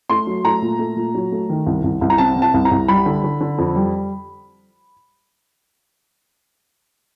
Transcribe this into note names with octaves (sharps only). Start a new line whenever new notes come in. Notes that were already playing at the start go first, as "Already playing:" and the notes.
A3 C6
F#3
A3 A#5
A#2
A3
A#2
F#3
A3
D#3
C2
C2
C2
A#5
C3 A5
C3
A5
C2
A#5
C2
G3 B5
D3
D3
D3
F2
G3